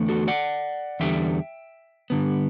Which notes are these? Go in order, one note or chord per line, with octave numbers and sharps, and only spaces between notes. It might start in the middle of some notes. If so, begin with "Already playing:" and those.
Already playing: E2 D3 A3
F#4 A4
D5 F#5
E2 D3 G3 E5 G5
G2 D3 G3 B3